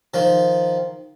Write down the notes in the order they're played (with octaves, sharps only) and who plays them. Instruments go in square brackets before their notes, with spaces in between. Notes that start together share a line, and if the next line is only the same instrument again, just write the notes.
[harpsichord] D#3 F3